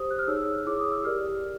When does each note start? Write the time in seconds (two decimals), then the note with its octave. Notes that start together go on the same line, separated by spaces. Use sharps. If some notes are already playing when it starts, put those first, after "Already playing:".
Already playing: G4 C5 D#6
0.11 F#6
0.19 F6
0.27 D#4 G#4 C#5 E6
0.66 E4 G#4 C#5 D6
0.80 D#6
0.92 E6
1.04 G4 A#4 D5 F6